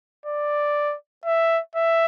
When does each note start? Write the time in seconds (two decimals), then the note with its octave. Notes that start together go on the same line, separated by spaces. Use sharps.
0.26 D5
1.26 E5
1.75 E5